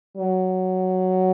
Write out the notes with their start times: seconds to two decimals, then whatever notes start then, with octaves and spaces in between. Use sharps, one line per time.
0.17 F#3